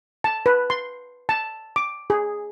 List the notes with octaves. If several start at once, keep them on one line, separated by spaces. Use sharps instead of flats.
A5
B4
C6
A5
D6
G#4